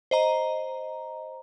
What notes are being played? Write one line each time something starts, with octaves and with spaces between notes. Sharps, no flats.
C5 D#5 A#5